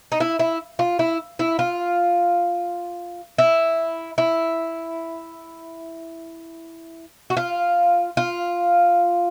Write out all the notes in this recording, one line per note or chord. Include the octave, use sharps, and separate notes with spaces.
D#4
E4
E4
F4
E4
E4
F4
E4
E4
F#4
F4
F4